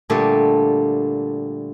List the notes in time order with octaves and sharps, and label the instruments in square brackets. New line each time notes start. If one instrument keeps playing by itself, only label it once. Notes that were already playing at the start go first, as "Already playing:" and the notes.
[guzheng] A#2 D3 G3 A3 G4